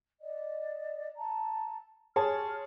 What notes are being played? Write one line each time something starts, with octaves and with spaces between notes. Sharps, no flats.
D5 D#5
A5 A#5
G4 G#4 C#5 A5 C6 F6